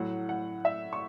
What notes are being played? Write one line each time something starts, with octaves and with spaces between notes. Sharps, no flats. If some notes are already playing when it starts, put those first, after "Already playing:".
Already playing: A2 F#3 F#5
F#5
E5
C#6